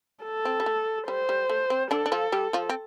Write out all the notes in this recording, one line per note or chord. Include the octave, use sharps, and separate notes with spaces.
A4
C4
G3
A3
G3 C5
G3
A3
C4
D3 D4 A4
D4
F3 F4
G3 G4
F3 F4
C4